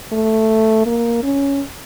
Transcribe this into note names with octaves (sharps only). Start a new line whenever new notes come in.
A3
A#3
C#4